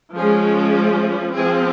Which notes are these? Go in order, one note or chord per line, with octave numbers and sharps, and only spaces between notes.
F3 G#3 C#4 G#4
F3 C4 G#4